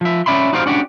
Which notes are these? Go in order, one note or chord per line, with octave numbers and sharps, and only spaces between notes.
F3 E5
C#4 D5 E5 B5 C6
D#4 F#4 G4 C5 D5 F5
C#4 D4 F#4 G4